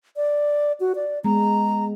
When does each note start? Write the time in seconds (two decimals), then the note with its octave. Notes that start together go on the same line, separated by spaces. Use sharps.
0.16 D5
0.80 F#4
0.95 D5
1.24 G#3 B3 A#5